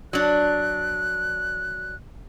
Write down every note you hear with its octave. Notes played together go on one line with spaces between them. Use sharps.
F#3 D4 F#6